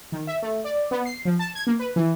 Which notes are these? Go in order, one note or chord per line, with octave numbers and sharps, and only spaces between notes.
D#3
E5
A3
D5
B3
C7
F3
A5
G#6
A#3
B4
E3